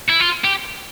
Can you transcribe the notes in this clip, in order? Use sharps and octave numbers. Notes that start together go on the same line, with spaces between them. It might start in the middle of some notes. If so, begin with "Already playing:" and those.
E4
F4
G4